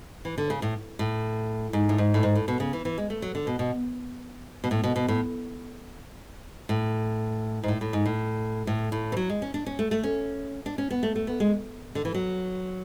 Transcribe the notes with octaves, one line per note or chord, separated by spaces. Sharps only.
E3
D3
C#3
A2
A2
G#2
A2
G#2
A2
G#2
A2
B2
C#3
E3
E3
G#3
A3
F#3
D3
B2
B2
B2
A2
B2
B2
A2
A2
G#2
A2
A2
G#2
A2
A2
A2
E3
F#3
G#3
C#4
D4
C#4
A3
A3
C#4
D4
C#4
B3
A3
A3
B3
G#3
D3
E3
F#3